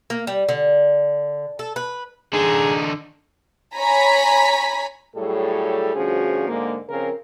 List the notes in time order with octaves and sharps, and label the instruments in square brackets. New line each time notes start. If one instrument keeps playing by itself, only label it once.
[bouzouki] A#3
G3
D3
A4
B4
[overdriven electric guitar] D3 D#4 [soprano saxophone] G#4
[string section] C#5 G#5 A#5 B5 B6
[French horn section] A2 F#3 G3 G#4 A4
D2 G2 F3 C#4 F#4 G#4
G#2 D3 G#3 A#3
C#3 F3 C4 A#4